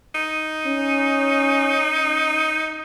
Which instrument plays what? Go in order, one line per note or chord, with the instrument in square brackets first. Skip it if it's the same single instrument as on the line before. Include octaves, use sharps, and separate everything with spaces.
[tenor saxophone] D#4
[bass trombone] C#4